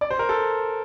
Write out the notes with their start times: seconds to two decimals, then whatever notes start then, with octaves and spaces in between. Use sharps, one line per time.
0.01 D5
0.11 C5
0.19 A#4
0.29 A4